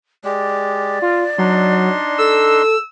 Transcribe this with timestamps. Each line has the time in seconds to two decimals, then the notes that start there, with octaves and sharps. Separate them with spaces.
0.25 G#3 G4 D5
1.02 F4
1.38 F#3 D4 D#4 C6
2.18 A4 E6